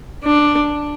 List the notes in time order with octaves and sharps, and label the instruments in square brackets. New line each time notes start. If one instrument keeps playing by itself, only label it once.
[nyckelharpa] D4